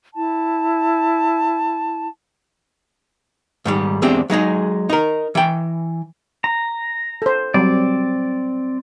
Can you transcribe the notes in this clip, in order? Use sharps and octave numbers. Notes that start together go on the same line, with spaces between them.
E4 A5
G#2 D#3 G3
E2 G#3 C4 D4 G4
F#3 G#3 D#4 G#4
D#4 A#4
E3 G5
A#5
A4 C5
F#3 G3 C4 D5